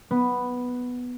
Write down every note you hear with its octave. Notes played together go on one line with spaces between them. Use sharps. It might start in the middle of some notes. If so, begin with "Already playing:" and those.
B3